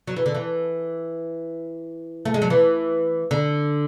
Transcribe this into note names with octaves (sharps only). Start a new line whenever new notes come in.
F#3
E3
D3
E3
A3
G#3
F#3
E3
D3